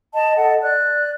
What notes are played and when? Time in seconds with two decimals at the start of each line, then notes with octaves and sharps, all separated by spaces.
0.14 D#5 A5
0.37 A4 D#5 F#5
0.62 D5 F#6